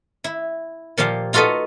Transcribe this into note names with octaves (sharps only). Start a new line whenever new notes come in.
E4
A#2 F3 A#3 G4 F5
D#4 F4 F#4 A4 B4 D#5